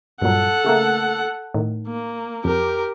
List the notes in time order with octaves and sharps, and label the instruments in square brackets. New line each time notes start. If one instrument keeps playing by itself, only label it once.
[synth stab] G2 A#2 F#3 [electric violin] A4 F#5
[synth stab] C#3 A3 A#3
A2 D#3
[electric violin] A#3
[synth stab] F2 [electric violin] G4 A#4